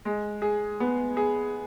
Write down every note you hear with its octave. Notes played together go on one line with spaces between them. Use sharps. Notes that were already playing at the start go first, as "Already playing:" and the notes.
G#3
G#4
B3
G#4